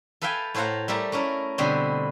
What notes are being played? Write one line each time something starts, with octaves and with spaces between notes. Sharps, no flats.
A4 B4 E5 F5 G5 G#5
A2 A4 C5 F5 F#5 A#5
G3 A3 A4 A#4 D5 E5
A3 C#4 E4 A#4
B2 D3 G3 B3 C4